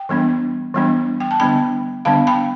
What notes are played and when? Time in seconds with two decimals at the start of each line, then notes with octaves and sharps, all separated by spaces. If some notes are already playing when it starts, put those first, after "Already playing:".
Already playing: G5
0.09 E3 G3 B3 D4
0.75 E3 G3 B3 D4
1.20 G5
1.31 A5
1.40 D3 G3 B3 D4 G5 B5
2.05 D3 G3 B3 D4 F5 A5
2.27 G5 B5